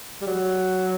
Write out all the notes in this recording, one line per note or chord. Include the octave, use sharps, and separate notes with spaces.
G3
F#3